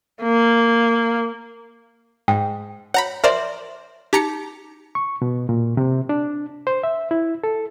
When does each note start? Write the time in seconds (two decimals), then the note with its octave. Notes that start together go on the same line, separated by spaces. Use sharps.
0.22 A#3
2.28 G#2 G5
2.94 C#5 F#5 A#5 B5
3.24 A#4 C5 D5 E5 C6
4.13 D#4 G4 A#5 C#7
4.95 C#6
5.22 B2
5.49 A#2
5.77 C3
6.09 D4
6.67 C5
6.83 E5
7.11 E4
7.44 A4